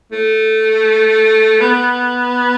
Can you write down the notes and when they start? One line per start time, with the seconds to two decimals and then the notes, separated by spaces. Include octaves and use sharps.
0.12 A3
1.61 B3